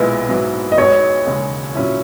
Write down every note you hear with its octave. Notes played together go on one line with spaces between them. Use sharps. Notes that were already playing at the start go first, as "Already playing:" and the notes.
Already playing: B1 A#2 G#3 B3 E4 B4
G#2 F#3 B3 E4
D#5
B1 B2 G#3 B3 D#4 C#5
E1 D#2 C#3 G#3
A#2 F#3 C#4 E4